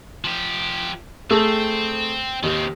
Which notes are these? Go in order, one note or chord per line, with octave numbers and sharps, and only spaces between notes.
F3 G4
A3 C4 G#4 E6
D#2 D#3 C4